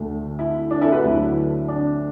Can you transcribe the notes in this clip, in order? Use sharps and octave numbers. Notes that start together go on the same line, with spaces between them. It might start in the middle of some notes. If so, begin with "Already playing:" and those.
Already playing: D2 D3 A3
E4
D4
E4 A4
F#4 B4
D2 D3 F#3 A3 E4
D4